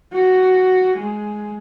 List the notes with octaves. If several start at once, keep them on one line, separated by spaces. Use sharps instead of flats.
F#4
G#3